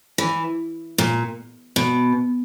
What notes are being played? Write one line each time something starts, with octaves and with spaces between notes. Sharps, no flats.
E3
A#2
B2